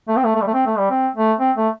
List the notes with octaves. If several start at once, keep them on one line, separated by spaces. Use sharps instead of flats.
A3
C4
A3
A3
G3
A3
C4
A3
G3
C4
A3
C4
A3